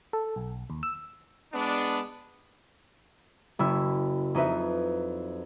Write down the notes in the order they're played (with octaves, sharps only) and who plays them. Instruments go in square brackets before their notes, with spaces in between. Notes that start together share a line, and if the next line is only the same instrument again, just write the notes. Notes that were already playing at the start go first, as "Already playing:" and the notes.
[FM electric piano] A4
B1
D#2
E6
[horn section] G#3 B3 D4
[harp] F#1 E4 E6
F2 D#4 B4 E5